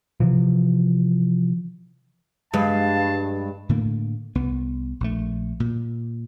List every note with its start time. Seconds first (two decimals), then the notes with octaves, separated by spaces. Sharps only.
0.20 C3 E3 F3
2.54 G2 G#3 F5 A5
3.69 A2 D3 A3 A#3
4.35 C2 B3
5.00 A#1 A3
5.60 A#2